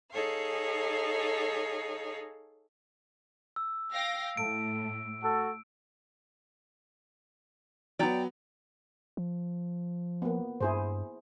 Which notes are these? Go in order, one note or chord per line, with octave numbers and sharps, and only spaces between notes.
D#4 G#4 A4 C#5 F5
E6
F5 G5 A#6
A2 A4 D7
F#4 A4
F#3 B3 D5 G5 A#5
F3
A#3 B3
G2 E4 G#4 C5